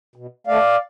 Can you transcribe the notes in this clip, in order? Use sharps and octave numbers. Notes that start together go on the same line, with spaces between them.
B2
A3 D5 F5